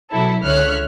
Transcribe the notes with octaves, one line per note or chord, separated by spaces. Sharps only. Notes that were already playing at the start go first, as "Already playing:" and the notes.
B2 F#3 E4 A4
C#2 D3 C#5 E5 F6 F#6